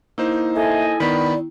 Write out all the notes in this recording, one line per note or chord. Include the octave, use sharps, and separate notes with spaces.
A#3 D#4 E4 C5
A4 D#5 E5 G#5
D#3 B3 D5 B5